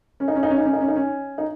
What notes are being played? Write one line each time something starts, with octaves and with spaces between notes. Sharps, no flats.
C#4
D#4
C#4
D#4
C#4
D#4
C#4
D#4
C#4
D#4
C#4
D#4